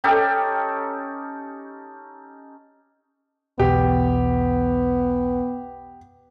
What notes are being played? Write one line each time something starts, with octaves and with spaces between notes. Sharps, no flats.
C#4 D#4 G4 A4
B1 E2 B2 B3 G4